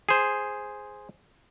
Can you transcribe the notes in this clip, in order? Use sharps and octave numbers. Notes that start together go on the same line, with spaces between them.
G#4 C5